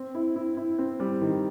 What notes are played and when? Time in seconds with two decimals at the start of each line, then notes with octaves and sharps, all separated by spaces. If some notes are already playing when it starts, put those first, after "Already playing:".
Already playing: C4
0.15 E4
0.36 E4
0.57 E4
0.79 C4
1.00 G3
1.21 D#3